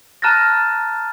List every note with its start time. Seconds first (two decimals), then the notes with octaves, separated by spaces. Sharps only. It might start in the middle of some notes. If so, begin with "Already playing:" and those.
0.22 A5 A#5 F6 F#6 A6 A#6